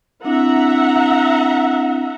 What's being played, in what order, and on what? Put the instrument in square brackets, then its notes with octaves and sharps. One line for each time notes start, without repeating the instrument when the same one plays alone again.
[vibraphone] C4 D4 E4 [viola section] E5 F#5 A#5